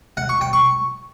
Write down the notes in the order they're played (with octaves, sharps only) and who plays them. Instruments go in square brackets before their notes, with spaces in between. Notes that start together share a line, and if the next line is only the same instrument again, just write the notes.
[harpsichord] F#5
C#6
G5
C#6